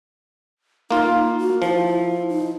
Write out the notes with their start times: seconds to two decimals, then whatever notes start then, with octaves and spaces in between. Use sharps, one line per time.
0.91 A#3 D#4 F4
1.39 F#4
1.62 F3 E4
2.29 D#4